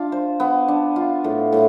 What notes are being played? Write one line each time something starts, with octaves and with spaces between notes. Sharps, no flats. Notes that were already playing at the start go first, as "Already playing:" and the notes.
Already playing: D4 F4
C5
B3
D4
F4
A2
A2